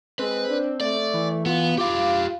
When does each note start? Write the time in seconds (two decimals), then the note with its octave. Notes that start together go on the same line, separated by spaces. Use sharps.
0.19 G#3 C4 B4
0.49 D4
0.81 A3 D5
1.14 E3
1.46 B3 F4
1.78 F4 G4 F5 D6